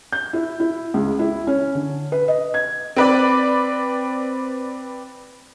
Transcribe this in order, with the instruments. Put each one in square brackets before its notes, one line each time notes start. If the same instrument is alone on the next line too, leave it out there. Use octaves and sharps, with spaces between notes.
[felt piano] G6
E4
E4
C#2
E4
C#4
D3
B4
D#5
G#6
[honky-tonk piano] C4 B4 D5